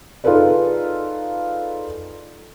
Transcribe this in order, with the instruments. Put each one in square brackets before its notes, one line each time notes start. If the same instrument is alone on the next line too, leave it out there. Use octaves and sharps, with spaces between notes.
[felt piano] D#4 F4 G#4 A4 B4 D5